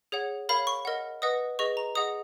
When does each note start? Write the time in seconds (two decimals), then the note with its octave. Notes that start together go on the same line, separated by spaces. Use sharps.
0.12 G#4 C#5 F#5
0.49 A#4 C#5 F5 B5
0.67 C#6
0.85 A#4 D#5 F#5
1.22 B4 D#5 F#5 D#6
1.59 G#4 B4 D#5 C#6
1.77 A#5
1.95 G#4 D#5 F#5 D#6